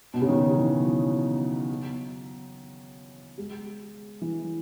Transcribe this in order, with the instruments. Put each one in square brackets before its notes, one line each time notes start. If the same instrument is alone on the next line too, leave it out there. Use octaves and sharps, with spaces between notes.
[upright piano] B2
C#3
D#3
E3
F#3
G#3
E3